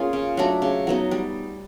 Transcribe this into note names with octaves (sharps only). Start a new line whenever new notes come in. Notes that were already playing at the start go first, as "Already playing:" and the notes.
Already playing: A#3 C#4 F4 G#4
C#3
F#3 A3 D4
C#3
F#3 B3 D#4
G3